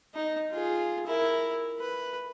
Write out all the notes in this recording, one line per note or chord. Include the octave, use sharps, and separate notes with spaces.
D#4
F4 G#4
E4 A#4
B4